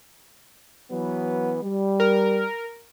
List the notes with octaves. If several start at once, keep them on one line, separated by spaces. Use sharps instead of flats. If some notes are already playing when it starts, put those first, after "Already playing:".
E3 F#3 B3
G3
A#4